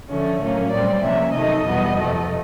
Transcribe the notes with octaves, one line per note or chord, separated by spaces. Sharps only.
D3 F3 A3 C#4
A2 F#3 A#3 C#4
A#2 G3 C4 D5
C3 F3 A#3 C#4 E5
C3 D#3 F#3 A3 D#5
E2 B2 G3 B3
F2 C3 F3 A3